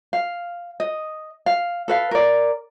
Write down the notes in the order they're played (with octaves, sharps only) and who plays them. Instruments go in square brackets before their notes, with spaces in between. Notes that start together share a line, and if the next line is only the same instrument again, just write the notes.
[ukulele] F5
D#5
F5
A4 B4 F5
A#4 D5